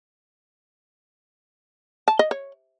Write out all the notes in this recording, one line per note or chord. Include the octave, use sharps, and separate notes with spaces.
A5
D#5
C#5